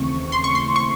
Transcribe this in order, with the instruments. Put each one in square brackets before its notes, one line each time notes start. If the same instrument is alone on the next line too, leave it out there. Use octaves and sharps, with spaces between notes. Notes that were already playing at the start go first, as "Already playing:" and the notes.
Already playing: [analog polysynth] D#2 C#3 E3 A3 C4 C#6
C6
C#6
C6
C#6